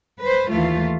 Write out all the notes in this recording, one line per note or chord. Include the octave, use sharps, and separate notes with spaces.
B4 C5
D#2 E3 A3 F4